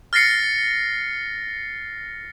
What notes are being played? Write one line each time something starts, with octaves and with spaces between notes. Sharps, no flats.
F6 A6 A#6 C7 C#7